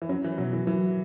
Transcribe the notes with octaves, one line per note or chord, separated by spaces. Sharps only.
E3
F#3 C#4
E3
B2 F#3
E3
E3 F#3